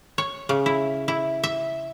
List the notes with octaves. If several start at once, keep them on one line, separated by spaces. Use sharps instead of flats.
C#5
C#3
E4
E4
E5